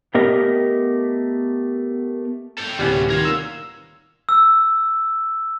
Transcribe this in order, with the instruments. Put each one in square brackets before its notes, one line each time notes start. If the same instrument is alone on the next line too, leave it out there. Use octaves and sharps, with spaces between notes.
[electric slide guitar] A3 B3 G4 A#4 D#5
[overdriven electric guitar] A4 G5
[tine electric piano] D2 A2 C3 [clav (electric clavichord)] G3 B3 C#4 [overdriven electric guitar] F#4 G#4
[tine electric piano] D#3 G#6 [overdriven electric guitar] F4 A#4
[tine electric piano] E6
[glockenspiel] E6